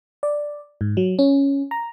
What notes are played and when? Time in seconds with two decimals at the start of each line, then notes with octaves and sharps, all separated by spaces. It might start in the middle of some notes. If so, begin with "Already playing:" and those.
0.23 D5
0.81 G#2
0.97 F#3
1.19 C#4
1.71 A#5